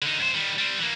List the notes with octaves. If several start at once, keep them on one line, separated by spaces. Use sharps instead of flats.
D3 D#4
F#2 C5
D#3 G3
G3 C4
E3 A#3